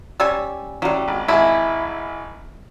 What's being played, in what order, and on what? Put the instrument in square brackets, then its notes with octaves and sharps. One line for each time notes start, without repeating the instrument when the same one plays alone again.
[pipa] G3 C#4 G#5 [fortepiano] E6
[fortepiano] A1 [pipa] F#3 G3
[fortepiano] G#1
[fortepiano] G#1 G#4 [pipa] E4